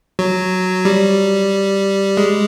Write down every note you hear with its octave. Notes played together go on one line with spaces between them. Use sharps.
F#3
G3
G#3